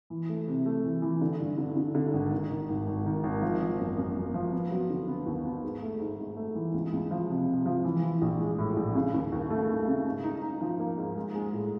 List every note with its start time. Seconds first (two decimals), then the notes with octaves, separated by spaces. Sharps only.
0.10 E3
0.29 A3
0.48 C3
0.66 A3
0.85 E3
1.02 E3
1.21 D3
1.39 G2
1.58 D3
1.76 D3
1.95 D3
2.14 G#1
2.32 D#3
2.50 D#3
2.69 G#1
2.87 G#1
3.06 D#3
3.24 G#1
3.42 F3
3.60 F3
3.79 F#2
3.97 F#2
4.16 F#2
4.34 F3
4.53 B3
4.71 F#3
4.90 D3
5.08 B3
5.26 D#2
5.45 B3
5.64 G#2
5.82 A3
6.00 G#2
6.19 G#2
6.37 A3
6.55 E3
6.74 C#2
6.93 C#2
7.11 F3
7.29 C3
7.48 C3
7.66 F3
7.84 E3
8.03 E3
8.22 A#1
8.40 G#3
8.58 A2
8.77 A#1
8.95 C#3
9.14 D#2
9.32 D#2
9.50 A3
9.69 A3
9.88 C#3
10.05 G#2
10.24 D#4
10.42 D#4
10.61 F3
10.80 A#3
10.98 G#2
11.16 G#3
11.35 G#3
11.53 A2